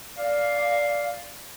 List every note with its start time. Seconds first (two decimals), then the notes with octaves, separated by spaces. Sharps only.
0.17 D5 F5